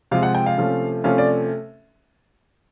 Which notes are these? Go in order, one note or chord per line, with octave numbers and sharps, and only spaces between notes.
C3 F3 G#3 F5
F#5
G5
F5
C3 F3 A3 C#4
C3 F3 A3 C#4 F5
D5